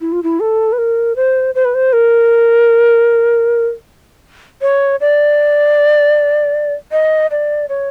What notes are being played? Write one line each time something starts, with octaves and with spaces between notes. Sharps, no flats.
E4
F4
E4
A4
B4
A#4
C5
C5
B4
C5
A#4
C#5
D5
D#5
D5
C#5